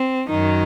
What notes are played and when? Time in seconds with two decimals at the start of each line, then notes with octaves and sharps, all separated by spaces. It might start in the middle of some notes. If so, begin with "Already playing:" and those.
Already playing: C4
0.29 F#2 D#3 F#3 D#4